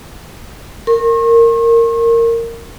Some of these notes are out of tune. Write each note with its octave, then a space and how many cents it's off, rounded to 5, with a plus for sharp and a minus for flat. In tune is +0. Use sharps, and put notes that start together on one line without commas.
A#4 -15 C#6 -45